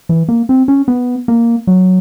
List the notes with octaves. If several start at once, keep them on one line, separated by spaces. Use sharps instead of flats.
E3
A#3
C4
C#4
B3
A#3
F#3